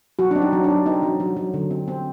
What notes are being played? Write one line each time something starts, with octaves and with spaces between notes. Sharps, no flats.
F#3 F#4
C4 D4
D#4
F#3
D4
C4
C4 D#4
F#3
F#3
F#3
D3
C4
C4